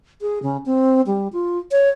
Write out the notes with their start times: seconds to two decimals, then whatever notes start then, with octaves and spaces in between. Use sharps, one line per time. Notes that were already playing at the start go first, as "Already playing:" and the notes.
0.22 G#4
0.43 C#3
0.66 C4
1.07 G3
1.33 F4
1.71 C#5